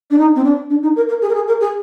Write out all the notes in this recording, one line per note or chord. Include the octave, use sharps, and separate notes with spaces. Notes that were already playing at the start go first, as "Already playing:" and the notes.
D4
D#4
C4
D4
D4
D#4
A#4
A#4
G#4
A#4
G#4
A#4
G#4